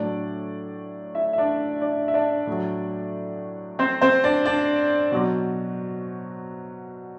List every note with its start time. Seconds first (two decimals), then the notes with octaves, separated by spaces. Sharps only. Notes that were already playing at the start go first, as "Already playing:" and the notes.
Already playing: A2 F#3 D4 D5
1.15 E4 E5
1.33 E5
1.38 D4 D5
1.81 D4 D5
2.08 E5
2.14 D4 D5
2.47 A2 F#3
3.79 C4 C5
4.01 C4 C5
4.24 D4 D5
4.45 D4 D5
5.11 B2 F#3